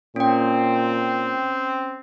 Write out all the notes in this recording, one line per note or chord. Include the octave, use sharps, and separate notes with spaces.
A#2 C4 C#4 G5